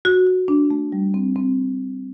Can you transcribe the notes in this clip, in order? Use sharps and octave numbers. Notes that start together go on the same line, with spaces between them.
F#4
F#4
D4
A3
G3
C4
C4